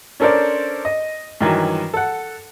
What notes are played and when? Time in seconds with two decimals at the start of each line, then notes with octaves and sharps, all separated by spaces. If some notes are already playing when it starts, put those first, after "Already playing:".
0.20 C#4 D4 A4 A#4 C5 D5
0.85 D#5
1.41 G2 D#3 E3 F#3
1.94 A4 F#5